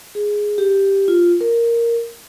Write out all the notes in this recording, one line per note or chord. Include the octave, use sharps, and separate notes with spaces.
G#4
G4
F4
A#4